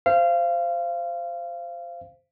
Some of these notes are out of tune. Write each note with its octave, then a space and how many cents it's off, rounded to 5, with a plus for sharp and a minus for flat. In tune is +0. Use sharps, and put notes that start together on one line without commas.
C5 +0 F5 -25